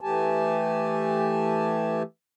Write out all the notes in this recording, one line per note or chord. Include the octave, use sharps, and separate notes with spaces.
E3 A3 G4 G#5 A5